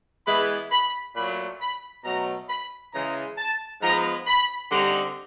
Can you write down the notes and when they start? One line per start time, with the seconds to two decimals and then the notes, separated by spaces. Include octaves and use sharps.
0.27 E3 G#3 B3 B5
0.71 B5
1.16 A#2 F#3 A3 B5
1.61 B5
2.04 B2 F#3 A3 A#5
2.50 B5
2.94 C#3 E3 G#3 A#5
3.38 A5
3.82 G#2 F3 G#3 B3 A#5
4.27 B5
4.71 D3 G3 C4 D#4 A#5